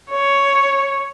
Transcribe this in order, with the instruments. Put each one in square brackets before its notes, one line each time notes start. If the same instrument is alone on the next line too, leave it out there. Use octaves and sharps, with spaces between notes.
[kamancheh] C#5